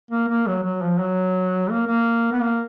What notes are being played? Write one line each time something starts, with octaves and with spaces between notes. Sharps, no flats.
A#3
A#3
F#3
F#3
F3
F#3
A#3
A#3
B3
A#3